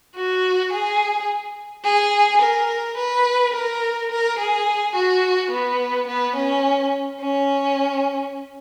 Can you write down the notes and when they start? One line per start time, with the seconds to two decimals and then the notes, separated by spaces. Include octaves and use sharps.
0.16 F#4
0.73 G#4
1.85 G#4
2.41 A#4
2.97 B4
3.54 A#4
4.11 A#4
4.39 G#4
4.96 F#4
5.51 B3
6.08 B3
6.36 C#4
7.21 C#4